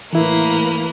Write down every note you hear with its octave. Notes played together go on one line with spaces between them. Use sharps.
A2 E3 A#3 E4 B4